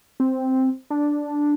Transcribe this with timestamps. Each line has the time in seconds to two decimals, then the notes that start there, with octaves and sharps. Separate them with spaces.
0.20 C4
0.90 D4